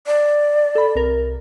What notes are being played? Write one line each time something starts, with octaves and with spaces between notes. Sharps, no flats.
D5
A4 B5
C2 A#4